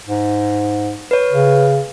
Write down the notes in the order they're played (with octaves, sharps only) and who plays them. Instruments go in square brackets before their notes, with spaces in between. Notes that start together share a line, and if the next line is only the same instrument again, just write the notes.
[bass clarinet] G#2
[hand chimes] B4 C#5
[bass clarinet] C#3